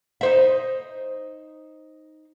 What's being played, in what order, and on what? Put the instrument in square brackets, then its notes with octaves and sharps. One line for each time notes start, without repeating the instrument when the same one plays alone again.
[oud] D#4 C5 E5